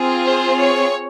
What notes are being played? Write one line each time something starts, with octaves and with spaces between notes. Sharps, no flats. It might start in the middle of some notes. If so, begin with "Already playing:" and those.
Already playing: C4 F4 G#4
C5
C#5